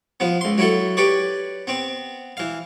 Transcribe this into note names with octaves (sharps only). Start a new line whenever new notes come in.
F3 B3
C#2 C6
F#3 E4 F#4 A4
G4 B4 C#5 D5
B3 C4
E3 F5